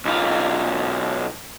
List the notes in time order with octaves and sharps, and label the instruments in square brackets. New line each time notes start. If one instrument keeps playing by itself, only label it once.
[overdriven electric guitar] B1 F4